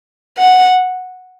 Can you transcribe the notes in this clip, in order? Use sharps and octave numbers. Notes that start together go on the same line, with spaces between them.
F#5